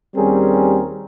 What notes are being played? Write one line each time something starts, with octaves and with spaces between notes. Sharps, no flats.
D#2 G3 C4 C#4 G#4 A#4